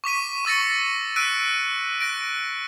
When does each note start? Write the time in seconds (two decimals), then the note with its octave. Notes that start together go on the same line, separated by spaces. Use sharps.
0.04 C#6 D6 B6 D#7
0.45 C#6 E6 A6 A#6 C#7
1.16 E6 F#6 B6 D7 D#7
2.01 F#6 A#6 D7